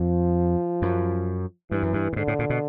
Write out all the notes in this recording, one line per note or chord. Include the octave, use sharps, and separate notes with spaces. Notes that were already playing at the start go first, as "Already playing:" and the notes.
Already playing: F2 F3
F#2
G2 E3
F#2
G2
A2
G#2 D3
A2
A#2
B2